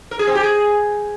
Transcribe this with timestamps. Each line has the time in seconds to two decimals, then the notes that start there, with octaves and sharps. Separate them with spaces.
0.11 A#4
0.19 G#4
0.27 C4
0.35 G4
0.43 G#4